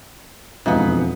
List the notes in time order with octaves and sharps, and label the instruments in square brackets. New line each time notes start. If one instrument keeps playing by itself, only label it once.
[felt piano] E1 F5 [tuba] F2 [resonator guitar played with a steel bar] G#2 B3